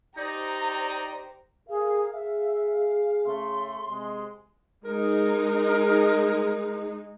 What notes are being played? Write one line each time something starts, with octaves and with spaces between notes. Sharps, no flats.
D#4 G4 C5 D5 A#5
G#4 A#4 F5
G#4 E5 F5
C#3 A3 C6
C3 G#3
G#3 D#4 A#4